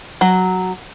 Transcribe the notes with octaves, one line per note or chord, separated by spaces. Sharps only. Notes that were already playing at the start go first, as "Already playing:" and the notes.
F#3